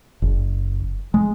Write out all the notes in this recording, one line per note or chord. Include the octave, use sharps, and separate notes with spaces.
F#1
G#3